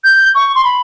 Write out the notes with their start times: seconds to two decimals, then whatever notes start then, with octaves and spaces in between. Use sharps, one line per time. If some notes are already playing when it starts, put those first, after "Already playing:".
0.04 G6
0.35 C#6
0.55 C6
0.64 B5